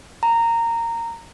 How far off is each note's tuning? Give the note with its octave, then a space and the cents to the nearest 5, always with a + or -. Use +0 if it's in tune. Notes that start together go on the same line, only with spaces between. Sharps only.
A#5 -15